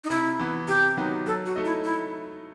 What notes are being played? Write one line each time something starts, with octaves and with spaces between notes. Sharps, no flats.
D#4
C3 E4
E3 B3
C3 G4
D#3 F#3 B3 D#4
F#3 A4
F#4
A3 D#4 A4 D#5
E4
E4